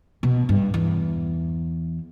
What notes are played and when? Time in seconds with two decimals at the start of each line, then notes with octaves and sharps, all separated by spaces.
0.23 B2
0.49 G2
0.74 E2